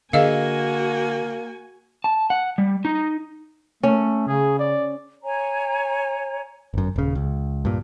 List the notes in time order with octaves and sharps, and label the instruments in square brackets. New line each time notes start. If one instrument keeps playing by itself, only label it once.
[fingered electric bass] D3 [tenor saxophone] A#3 [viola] F#4 G#5 [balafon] G#4 D#5 F5
[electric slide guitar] A5
F#5
G3
D#4
[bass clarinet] A3 [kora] C#4
[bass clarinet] C#3 [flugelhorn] G#4
[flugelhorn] D5
[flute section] C#5 G#5 A#5
[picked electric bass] G1 F#2
D#1 C#3
C#2
G2 A#2